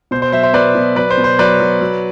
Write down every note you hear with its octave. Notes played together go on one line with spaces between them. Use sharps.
B2 C5
C5
F#3 C5 E5
C5 E5
B2 B4 D5
B2
F#3 B4 D5
C5
B2
C5
F#3 B4 D5
F#3
F#3